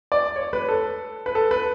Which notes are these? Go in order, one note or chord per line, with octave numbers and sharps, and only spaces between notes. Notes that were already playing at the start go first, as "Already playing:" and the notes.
D5
C#5
B4
A4
B4
A4
B4